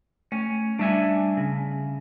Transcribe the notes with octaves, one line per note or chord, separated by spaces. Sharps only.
A3 C#4
G3 D4 E5 G#5
C#3